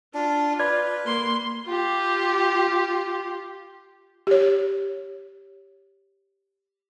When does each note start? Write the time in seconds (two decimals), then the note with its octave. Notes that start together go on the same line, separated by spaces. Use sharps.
0.14 D4 F4
0.60 B4 D5 G#6
1.05 A#3 C6
1.66 F4 G4
4.27 G4 C#5